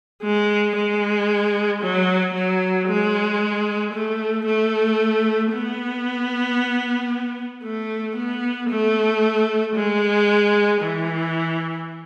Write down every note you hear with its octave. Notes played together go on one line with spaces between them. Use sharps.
G#3
G#3
F#3
F#3
G#3
A3
A3
B3
A3
B3
A3
G#3
E3